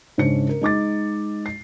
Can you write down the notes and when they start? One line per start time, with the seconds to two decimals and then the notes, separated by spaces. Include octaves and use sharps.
0.18 G#2 C#3 C#4 D4 C#7
0.49 A#4
0.61 G#3 D#4 D6 A6
1.46 C7